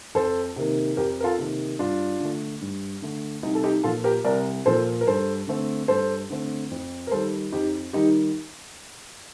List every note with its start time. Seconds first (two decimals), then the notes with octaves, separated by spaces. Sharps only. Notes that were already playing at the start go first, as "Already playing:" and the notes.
0.15 F2 A4 C5
0.56 C3 D#3 A#3
0.97 F2 G4 A#4
1.20 A#4
1.24 F4 A4
1.38 C3 D#3 A#3
1.79 G2 D4 F4
2.20 D3 A3
2.61 G2
3.02 D3 A3
3.43 C2 D#4
3.55 A4
3.64 D#4 G4
3.83 A#2 F3 F4 A4
4.04 G4 A#4
4.24 C2 A#4 D5
4.66 A#2 F3 A4 C5
5.01 A#4
5.07 G2 A4 C5
5.47 D3 A3 C4
5.88 G2 A4 C5
6.30 D3 A3 C4
6.71 F2
7.07 A#4
7.11 D#3 G3 A4 C5
7.52 F2 D#4 G4
7.93 D#3 G3 D#4 G4